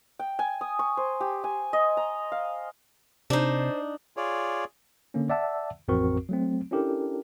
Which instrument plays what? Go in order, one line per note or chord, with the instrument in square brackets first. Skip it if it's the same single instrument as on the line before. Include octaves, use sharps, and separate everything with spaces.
[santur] G5
G#5
D#6
C#6
C5
G4
G#5
D#5
A#5
F5
[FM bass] C3 [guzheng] D4 D#4 [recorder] C5
[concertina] F4 G#4 C#5 D5
[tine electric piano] D3 A#3 C#4
D5 E5 F#5 A5 E6
A1 F2 C4 F#4 A#4 C#6
F#3 A3 C4
C#4 D4 E4 G4 A4 A#4